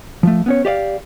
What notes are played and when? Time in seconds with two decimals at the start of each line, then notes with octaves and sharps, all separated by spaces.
0.23 F3 A3
0.46 B3 C#4 C#5
0.65 G4 D5 D#5 F5